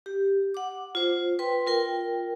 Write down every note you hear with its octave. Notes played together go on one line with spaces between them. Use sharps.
G4
F#5 D6
F4 C5
B4 G5 C6
F4 A#4 G5